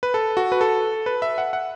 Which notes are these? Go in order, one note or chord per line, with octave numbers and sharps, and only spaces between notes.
B4
A4
F#4
B4
A4
B4
E5
F#5
F#5